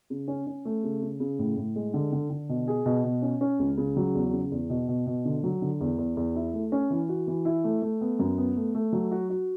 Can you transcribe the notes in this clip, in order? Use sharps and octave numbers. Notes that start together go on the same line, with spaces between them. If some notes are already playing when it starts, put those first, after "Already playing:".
C#3
C#4
C#4
A3
C#3
C#3
C#3
A2
A2
G#3
D3
D3
D3
B2
G#4
B2
B2
C#4
C#4
C#2
C#3
F#3
E2
C#3
E2
B2
B2
B2
D3
F#3
D3
E2
E2
E2
E4
A3
C#4
E3
F#4
E3
E4
A3
A3
B3
F#2
B3
A3
A3
F#3
F#4
F#4